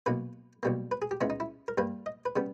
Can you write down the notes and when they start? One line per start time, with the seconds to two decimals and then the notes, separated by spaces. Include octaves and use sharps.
0.06 B1 B2 A#3 B4
0.63 B1 B2 G3 A#3
0.91 B4
1.02 G#4
1.11 G4
1.21 C#2 C#3 G#3 B3 E4
1.30 D#4
1.40 E4
1.68 A#4
1.78 G2 G3 A#3 B4
2.06 D#5
2.25 B4
2.36 C#3 G3 B3